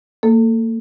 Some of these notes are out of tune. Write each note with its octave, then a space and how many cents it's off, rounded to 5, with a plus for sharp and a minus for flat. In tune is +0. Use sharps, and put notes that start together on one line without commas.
A#3 -40 A4 +0